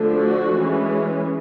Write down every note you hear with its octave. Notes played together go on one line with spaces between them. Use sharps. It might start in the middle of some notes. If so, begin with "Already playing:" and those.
Already playing: D3 F3 A3 D4
F#4
E3 G#3 C#4